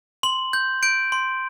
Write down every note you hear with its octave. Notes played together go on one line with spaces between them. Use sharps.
C6 F#7
G6
G6 D7
C6